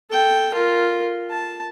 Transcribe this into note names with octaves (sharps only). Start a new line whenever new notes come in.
A4 G5
F4 A#4
A5